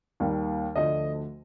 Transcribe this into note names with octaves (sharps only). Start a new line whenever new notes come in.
D#2 D#3 G3 A#3
D2 D3 F3 A3 D#5